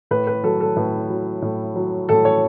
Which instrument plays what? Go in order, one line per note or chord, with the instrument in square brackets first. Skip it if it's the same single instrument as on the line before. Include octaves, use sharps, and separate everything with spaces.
[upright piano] A2 B4
B4
F#3 A4
A4
A2 B4
F#3
A2
F#3
A2 A4
C#5